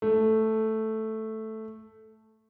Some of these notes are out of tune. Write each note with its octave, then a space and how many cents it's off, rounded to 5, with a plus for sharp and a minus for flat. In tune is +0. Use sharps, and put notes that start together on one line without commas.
A3 +0